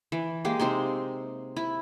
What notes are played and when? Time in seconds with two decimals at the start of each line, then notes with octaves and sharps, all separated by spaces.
0.12 E3
0.45 G#3 A#3 G4
0.60 C3 C4 D#4 C6
1.56 E4